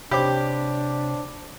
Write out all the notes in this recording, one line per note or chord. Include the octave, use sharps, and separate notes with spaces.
C3 D4 G4 C5 C#5 B5 D6